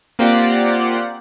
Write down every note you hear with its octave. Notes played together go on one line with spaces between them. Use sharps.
A#3 C4 F4 G4 D5 F#5